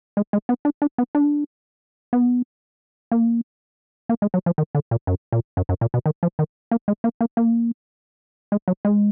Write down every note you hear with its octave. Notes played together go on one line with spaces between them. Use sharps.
G#3
G#3
B3
D4
D4
B3
D4
B3
A#3
A#3
G#3
F#3
F3
D#3
D3
A#2
F#2
A#2
F#2
F#2
A#2
B2
D#3
F3
D#3
A#3
G#3
A#3
A#3
A#3
G#3
F#3
G#3